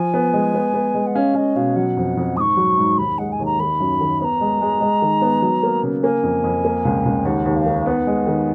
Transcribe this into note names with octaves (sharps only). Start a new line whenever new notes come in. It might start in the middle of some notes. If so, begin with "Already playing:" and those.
Already playing: F3 G#5
B3
G#3
B3
B3
G#3
F#5
C#4 F5
C#4 D#5
B2 F5
F#3 F#5
F2
F2
G#2 C#6 D#6
F#3
G#2
D#2 B5
G#3 F#5
G#5
D#2
A#5
D#3 B5
F#2
D#3
B3 A#5 B5
G#3
G#3
G#3
D#3
B3
F#3
A#3
C#3
A#3 G#5
F2
F2
A#3
C#2
C#2
D#2 F#5
D#2
F5
D#3
B3 F#5
G#3
D#3